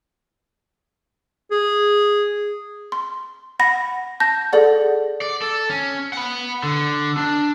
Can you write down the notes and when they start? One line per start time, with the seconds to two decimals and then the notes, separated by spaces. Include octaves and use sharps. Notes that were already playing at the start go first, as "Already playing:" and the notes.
1.51 G#4
2.92 C6
3.60 F#5 B5 A#6
4.20 A5 G6 A#6
4.53 G#4 A4 D5 F#5
5.22 D5
5.42 A4
5.70 C#4
6.13 F#5 B5
6.63 D3
7.17 D4